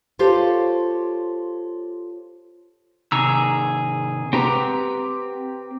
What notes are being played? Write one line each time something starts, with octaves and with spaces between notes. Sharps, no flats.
F4 G4 A4 C5 C#5
C3 D#3 G#4 A#5 E6
C4 G4 B4 F#5 G5 A#5